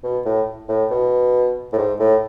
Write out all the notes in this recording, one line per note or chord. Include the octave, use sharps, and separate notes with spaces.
B2
A2
A2
B2
A2
G#2
A2